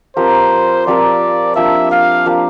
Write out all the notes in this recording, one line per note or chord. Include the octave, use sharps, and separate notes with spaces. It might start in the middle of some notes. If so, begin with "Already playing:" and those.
F3 C4 G4 A#4 C5
F3 C4 G4 A#4 D5
F3 A#3 D4 G4 E5
F5
F3 A#3 D4 G4